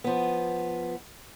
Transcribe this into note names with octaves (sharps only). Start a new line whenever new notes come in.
F3 B3